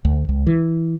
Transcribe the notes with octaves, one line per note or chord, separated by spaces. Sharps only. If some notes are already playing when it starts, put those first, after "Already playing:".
D2
C#2
E3